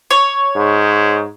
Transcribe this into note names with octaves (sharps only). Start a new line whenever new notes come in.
C#5
G#2